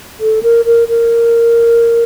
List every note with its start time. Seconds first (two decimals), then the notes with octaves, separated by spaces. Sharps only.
0.20 A4
0.43 A#4
0.65 A#4
0.88 A#4